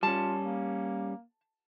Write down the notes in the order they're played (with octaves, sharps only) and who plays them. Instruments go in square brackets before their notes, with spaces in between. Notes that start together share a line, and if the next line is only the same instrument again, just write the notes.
[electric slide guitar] G3 C#4 [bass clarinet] F4 [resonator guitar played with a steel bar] A5
[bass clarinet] A#3